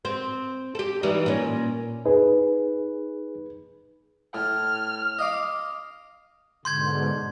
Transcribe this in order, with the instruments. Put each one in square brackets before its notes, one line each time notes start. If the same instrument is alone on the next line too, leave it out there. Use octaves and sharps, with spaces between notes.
[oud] C4
G4 A4
E3 G3 D#4
A#2 C#4
[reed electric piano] D#4 G#4 [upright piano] B4
[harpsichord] A2 [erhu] F6
[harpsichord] D#5 F5 D6
[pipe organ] G#2 B2 D3 [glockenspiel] C6 G6 G#6